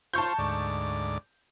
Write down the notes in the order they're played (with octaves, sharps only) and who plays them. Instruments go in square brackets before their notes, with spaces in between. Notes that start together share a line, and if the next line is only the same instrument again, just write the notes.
[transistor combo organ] F4 C5 [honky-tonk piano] A5 C#6 G6
[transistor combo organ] D2 G#2 D5